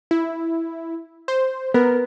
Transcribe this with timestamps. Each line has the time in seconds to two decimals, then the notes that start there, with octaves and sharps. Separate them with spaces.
0.11 E4
1.28 C5
1.74 B3 A#4